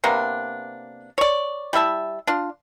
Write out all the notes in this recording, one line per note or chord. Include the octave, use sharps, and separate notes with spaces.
C3 A#3 B3 D4
C#5 D5
G3 E4 E5 A5
D4 F4